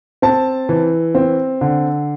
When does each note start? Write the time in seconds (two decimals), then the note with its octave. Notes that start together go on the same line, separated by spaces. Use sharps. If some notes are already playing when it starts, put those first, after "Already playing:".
0.22 C4 A5
0.69 E3
1.15 C4
1.61 D3